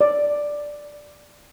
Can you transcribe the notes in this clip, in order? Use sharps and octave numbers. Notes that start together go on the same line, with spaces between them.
D5